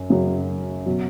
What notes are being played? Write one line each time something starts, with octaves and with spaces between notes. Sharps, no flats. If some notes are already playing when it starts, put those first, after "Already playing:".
Already playing: F#2
F#2 C#3 F#3
B2 F#3